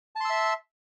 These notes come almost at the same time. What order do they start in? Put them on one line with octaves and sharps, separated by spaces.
A5 C6 E6 E5